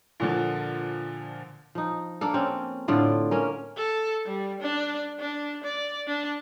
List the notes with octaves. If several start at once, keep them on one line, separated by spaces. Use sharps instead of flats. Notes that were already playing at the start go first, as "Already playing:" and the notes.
A#2 D3 F3
F3 D#4
A#3 D4 A4
C4 C#4
A2 D3 F4 D5
A#3 C#4 A#4
A4
G3
D4
D4
D5
D4